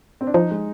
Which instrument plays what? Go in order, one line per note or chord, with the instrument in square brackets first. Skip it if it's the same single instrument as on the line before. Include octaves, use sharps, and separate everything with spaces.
[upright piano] C4
D4
[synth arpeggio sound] F3 [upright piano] D#4
[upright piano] G#3